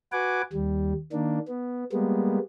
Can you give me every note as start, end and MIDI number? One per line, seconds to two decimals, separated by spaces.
0.12 0.42 66
0.12 0.42 71
0.12 0.42 78
0.12 0.42 80
0.12 0.42 86
0.53 0.93 39
0.53 0.93 55
1.12 1.39 51
1.12 1.39 58
1.12 1.39 62
1.48 1.84 59
1.92 2.39 55
1.92 2.39 56
1.92 2.39 58
1.92 2.39 59